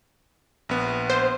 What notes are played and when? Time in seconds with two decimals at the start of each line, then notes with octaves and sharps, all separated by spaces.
0.69 A#1 B3
1.10 C5